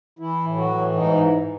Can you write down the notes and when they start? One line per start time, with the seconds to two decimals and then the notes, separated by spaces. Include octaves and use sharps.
0.19 E3 E4
0.45 A2
0.57 F#3 F#4
0.70 E3
0.95 G#2 D#4